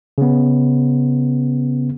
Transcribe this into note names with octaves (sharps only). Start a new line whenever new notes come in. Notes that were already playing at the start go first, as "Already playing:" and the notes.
C#3 B3